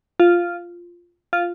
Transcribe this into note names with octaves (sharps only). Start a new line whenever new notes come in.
F4
F4